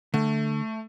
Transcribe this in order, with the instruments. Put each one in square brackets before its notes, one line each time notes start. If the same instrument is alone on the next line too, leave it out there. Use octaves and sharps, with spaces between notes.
[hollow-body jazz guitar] D3 [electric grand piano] A3